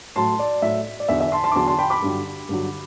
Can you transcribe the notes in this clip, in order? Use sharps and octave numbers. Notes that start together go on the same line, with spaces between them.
A2 F#3 A5 C6
D5
A2 F#3 E5
D5
E2 D3 F#3 E5
E5
A5 C6
A5 C6
D6
E2 D3 F#3 A5 C6
A5 C6
G5 B5
B5 D6
G2 D3 F#3
G2 D3 F#3